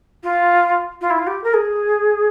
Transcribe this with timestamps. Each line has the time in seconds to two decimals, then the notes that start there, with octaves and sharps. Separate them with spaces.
0.23 F4
1.01 F4
1.10 E4
1.18 F4
1.26 G4
1.43 A#4
1.53 G#4